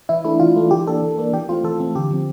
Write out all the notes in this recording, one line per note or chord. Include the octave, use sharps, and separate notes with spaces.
E3 E4
A3 D4 E4
E3 F4
A3 D4
E3 G4
A#3 D4 A4
E3
A#3 D4
E3 G4
A3 C4 F4
E3 A4
A3 C4
D3 G4
F3 C4